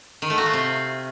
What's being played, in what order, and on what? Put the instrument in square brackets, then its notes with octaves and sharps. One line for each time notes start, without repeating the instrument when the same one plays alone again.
[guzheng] D#3
A3
F#4
F4
C3